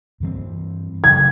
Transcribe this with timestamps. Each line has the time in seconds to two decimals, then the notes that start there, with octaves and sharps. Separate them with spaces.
0.20 G2 E3 G3 C4
1.04 C#3 F#3 A3 G#6